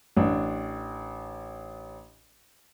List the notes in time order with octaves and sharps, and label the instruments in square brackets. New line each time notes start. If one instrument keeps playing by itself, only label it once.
[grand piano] A1 D4